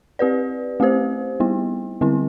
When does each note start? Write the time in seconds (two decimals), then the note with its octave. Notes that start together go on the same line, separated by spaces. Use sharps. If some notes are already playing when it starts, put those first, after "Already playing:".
0.19 C4 G4 B4 D5
0.80 A3 C4 G4 C5
1.40 G3 B3 E4
2.01 D3 G3 C4 E4